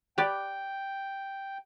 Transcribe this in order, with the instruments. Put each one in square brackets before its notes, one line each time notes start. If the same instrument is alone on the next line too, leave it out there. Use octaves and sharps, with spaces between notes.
[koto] G4 B4 D5 [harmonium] G5